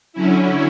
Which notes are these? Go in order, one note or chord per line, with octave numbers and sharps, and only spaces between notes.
D3 F#3 C#4 E4